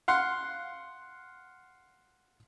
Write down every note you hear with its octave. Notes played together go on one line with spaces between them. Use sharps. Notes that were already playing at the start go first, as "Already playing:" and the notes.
F5 F#5 C6